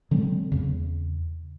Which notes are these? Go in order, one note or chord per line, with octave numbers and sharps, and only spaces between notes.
D3 F#3 G#3 C4
E2 C#3